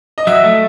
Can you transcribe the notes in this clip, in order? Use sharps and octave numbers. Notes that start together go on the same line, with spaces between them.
D#5
F#3 E5
A3